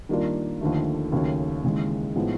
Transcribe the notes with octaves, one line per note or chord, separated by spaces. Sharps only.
D#3 G3 A#3 D4 F4
D#2 D3 F3 A3
D#2 C#3 F#3 A3 C#4
D#2 C#3 E3 G#3
A2 F3 G#3 B3 D#4